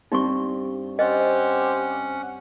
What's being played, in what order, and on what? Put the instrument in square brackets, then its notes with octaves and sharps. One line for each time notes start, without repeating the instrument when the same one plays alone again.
[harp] G2 C4 [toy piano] D#4 C#6
[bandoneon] C#4 F#5 [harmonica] G4 C5 [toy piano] D#5